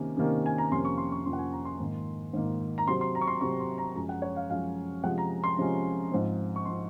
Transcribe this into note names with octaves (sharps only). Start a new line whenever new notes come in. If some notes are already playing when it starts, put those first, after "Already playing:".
Already playing: C3 D#3 A#3 C#4
C3 D#3 A#3 C#4
G#5
A#5
F2 C3 F3 A#3 C#4 C6
C#6
C6
C#6
F2 C3 F3 A#3 C#4 C6
F#5
G#5
A#5
C6
G#2 D#3 A#3
G#2 D#3 A#3
A#5
C3 F#3 C4 C6
C6
A#5
C#6
C6
C3 F#3 C4 C#6
C6
A#5
F#2 F3 G#3 C#4 A#5
F#5
C#5
F5
F#2 F3 G#3 C#4 F5
C3 F3 G#3 C#4 F#5
A#5
C6
C3 F3 G#3 C#4
G#2 F3 C4
C#6
F3 C4 C6